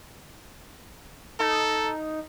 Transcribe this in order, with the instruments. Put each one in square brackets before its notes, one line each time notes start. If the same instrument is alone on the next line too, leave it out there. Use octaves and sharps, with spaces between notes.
[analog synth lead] D#4 [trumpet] A4